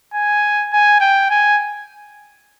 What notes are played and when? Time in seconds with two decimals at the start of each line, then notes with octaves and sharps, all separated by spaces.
0.14 G#5
0.73 G#5
1.00 G5
1.30 G#5